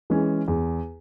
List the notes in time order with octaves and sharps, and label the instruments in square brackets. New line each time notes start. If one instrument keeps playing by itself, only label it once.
[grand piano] E3 G#3 C#4
E2